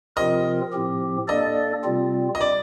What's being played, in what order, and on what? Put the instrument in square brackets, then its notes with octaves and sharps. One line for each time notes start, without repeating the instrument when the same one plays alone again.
[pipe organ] C3 F3 C4 F4 A#4 [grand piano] D#5
[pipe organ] A2 F3 C4 G4
[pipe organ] A#3 D4 A4 D5 [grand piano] D#5
[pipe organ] C3 G3 C4 F4
[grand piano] D#5
D5